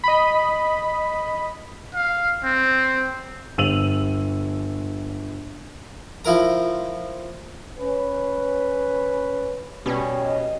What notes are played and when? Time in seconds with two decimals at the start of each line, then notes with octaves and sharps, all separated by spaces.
0.04 D#5 B5
1.95 F5
2.44 C4
3.58 G1 E6 D#7 F7 F#7
6.25 F3 E4 A#4 A#5
7.79 C#4 B4
9.86 B2 G3 C#4
10.25 D#5